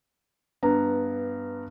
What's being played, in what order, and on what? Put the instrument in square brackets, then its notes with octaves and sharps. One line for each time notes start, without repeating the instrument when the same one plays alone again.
[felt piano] G2 B3 A#5